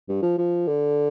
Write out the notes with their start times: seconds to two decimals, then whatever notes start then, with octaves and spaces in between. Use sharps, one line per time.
0.08 G2
0.22 F3
0.38 F3
0.67 D3